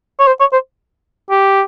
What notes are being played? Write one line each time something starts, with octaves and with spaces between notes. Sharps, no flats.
C#5
C5
C#5
C5
G4